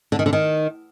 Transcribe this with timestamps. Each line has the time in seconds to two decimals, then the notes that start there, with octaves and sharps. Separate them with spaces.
0.12 D3
0.19 D#3
0.26 D3
0.33 D#3